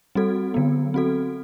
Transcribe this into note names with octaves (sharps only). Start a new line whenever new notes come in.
G3 C4 F#4 A4
D3 F#3 B3
C4 F#4 A4